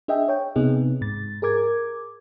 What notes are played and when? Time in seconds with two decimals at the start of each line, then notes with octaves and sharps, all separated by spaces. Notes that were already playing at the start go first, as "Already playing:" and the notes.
0.08 D4 G#4 D#5 E5 G5
0.28 C#5 G5
0.56 C3 B3 D#4 G#4
1.01 G#2 A6
1.42 G#4 A#4 D6 G#6